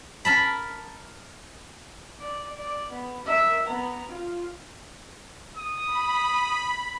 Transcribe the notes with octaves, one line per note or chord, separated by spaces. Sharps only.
A#4 A5 B5
D5
D5
B3
A#4 E5
B3 A#5
F4
D#6
B5